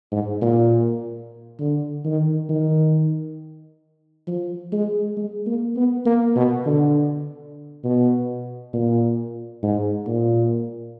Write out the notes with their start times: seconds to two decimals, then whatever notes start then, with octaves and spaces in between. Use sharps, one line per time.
0.12 G#2
0.42 A#2
1.60 D3
2.05 D#3
2.49 D#3
4.27 F3
4.72 G#3
5.17 G#3
5.46 A#3
5.76 B3
6.06 A#3
6.36 B2
6.66 D3
7.84 B2
8.73 A#2
9.63 G#2
10.07 A#2